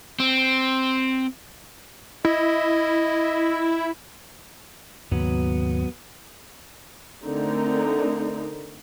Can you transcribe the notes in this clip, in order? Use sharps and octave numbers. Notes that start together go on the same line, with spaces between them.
C4
E4 D#5
D#2 G#2 C#3 F#3 B3
D3 A3 C4 D#4 A#4